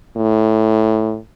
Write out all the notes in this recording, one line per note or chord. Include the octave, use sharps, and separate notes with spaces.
A2